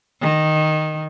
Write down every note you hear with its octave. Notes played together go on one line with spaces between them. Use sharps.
D#3